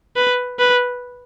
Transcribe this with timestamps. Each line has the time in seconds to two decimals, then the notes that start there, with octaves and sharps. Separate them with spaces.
0.16 B4
0.59 B4